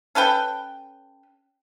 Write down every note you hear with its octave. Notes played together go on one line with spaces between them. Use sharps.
C#4 A4 B4 G5